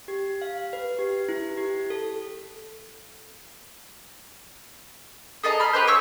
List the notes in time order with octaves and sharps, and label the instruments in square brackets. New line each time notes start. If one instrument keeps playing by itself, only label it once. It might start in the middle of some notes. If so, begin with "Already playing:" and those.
[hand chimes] G4
F5
B4
G4
E4
G4
A4
[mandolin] G#4 A4 D#5 A#5
B5 F6
G4 B4 C5
C#5 C#6 E6